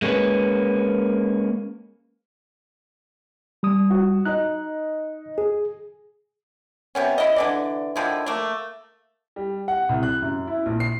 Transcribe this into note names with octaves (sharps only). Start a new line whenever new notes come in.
G#3 A#3 C#4 D4 B4
G3 D#6
F#4
D#4 D#5 F#6
G#4
C3 B3 C#4
E4 D#5
D3 E3 D5
D3 D#3 F3 E4
A3 A#3
G3
F#5
C2
F#6
F#2
E4
A#1
C7